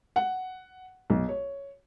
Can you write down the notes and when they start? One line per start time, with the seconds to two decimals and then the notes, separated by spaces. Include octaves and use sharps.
0.16 F#5
1.10 B1
1.29 C#5